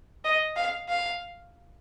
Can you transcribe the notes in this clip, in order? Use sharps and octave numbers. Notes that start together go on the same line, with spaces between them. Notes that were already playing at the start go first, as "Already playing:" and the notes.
D#5
F5
F5